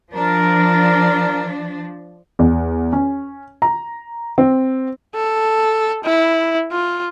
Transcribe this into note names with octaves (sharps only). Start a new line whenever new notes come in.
F3 D4 A#4
E2
C#4
A#5
C4
A4
E4
F4